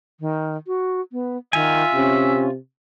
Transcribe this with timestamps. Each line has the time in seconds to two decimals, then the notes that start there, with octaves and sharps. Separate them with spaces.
0.20 D#3
0.67 F#4
1.12 B3
1.53 D#3 F4 E5 G#5
1.95 C3 C#4